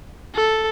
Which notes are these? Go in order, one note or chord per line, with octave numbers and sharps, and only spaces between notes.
A4